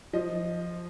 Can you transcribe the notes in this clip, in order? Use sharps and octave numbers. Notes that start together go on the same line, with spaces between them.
F3 D#5